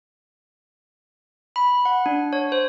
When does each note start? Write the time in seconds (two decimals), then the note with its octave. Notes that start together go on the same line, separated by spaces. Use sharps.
1.56 B5
1.85 F#5
2.06 D4
2.33 C#5
2.52 C5